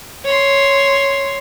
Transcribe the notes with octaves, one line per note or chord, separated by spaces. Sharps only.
C#5 C6